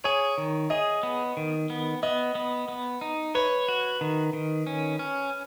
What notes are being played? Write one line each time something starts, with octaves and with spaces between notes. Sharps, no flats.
G#4 C#5
D#3
G#4 D#5
B3
D#3
B3
B3 D#5
B3
B3
D#4
B4 C#5
F#4
D#3
D#3
C#4
C#4